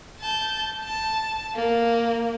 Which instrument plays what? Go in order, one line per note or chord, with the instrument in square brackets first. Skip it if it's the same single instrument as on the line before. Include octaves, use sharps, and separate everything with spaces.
[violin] A5 G6
A5
A#3